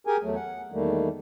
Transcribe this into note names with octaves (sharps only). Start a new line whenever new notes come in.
G4 G#4 A#4 G#5
E2 F#3 A3
F#5
E2 D#3 G3 A3 A#3